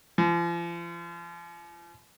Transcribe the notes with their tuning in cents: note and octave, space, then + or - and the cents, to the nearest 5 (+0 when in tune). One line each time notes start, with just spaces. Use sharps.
F3 -40